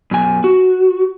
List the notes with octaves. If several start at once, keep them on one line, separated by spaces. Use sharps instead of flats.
F#2 B2 G#5
F#4